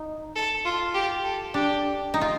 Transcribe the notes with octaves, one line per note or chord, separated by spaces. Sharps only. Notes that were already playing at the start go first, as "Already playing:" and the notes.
Already playing: D#4
A4
F4
G4
A4
D4 G4
D#4
F4